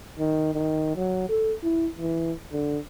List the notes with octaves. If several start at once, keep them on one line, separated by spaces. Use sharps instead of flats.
D#3
D#3
F#3
A4
E4
E3
D3